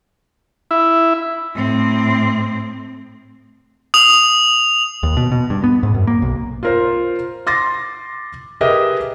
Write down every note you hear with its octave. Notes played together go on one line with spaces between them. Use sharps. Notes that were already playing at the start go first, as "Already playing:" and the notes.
E4
A2 C4
D#6 F7
D#2
B2
B2
G2
B3
G#2
F#2
A#3
B1
F4 A#4 C5
C6 D6 A6 A#6
G4 G#4 A#4 B4 D#5 E5